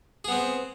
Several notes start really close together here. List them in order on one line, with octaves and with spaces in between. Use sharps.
G#4 B3 C4